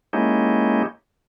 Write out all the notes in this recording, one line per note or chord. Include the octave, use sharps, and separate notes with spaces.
G#3 A#3 C#4 D#4 E4 G4